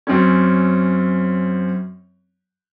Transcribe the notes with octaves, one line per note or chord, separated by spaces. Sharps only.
F#2 C4 C#4